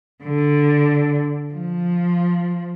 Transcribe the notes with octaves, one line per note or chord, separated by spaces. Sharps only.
D3
F3